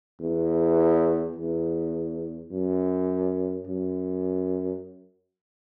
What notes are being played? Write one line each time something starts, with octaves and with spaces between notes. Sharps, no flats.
E2
E2
F#2
F#2